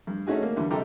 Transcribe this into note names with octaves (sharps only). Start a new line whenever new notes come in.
G2
A3 C#4 D#4 F#4 G#4
A#3
E2 D3 G3
C3 G3 A4 G5 A#5 D6